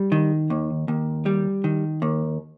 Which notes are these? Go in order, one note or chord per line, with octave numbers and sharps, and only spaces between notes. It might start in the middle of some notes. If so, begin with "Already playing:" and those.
Already playing: G3
D#3
D#2
D#2
G3
D#3
D#2